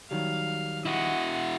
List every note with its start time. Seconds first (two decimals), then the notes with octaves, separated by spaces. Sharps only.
0.11 D#3 F#3 G3 F5
0.85 E4 F#4 D#5 F#5